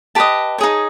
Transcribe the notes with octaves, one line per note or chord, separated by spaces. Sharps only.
G4 B4 D#5 A5
D#4 G#4 C#5